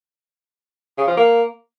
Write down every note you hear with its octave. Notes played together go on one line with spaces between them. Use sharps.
C#3
F3
A#3